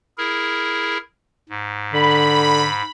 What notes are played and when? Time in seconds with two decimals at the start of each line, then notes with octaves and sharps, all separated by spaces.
0.18 E4 G#4 A#4
1.49 G#2
1.93 D3 B5